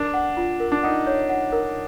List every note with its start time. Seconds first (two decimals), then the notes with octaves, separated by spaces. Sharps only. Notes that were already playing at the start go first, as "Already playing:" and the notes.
Already playing: D4 A#4
0.14 F#5
0.37 F4
0.60 A#4
0.72 D4
0.83 D#4 F#5
1.07 C#5
1.29 F#5
1.52 A#4